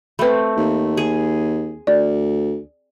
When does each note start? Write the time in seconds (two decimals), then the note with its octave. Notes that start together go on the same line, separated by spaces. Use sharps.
0.19 A3 C4 B4 B5
0.57 D#2
0.97 G#4
1.87 D2 D5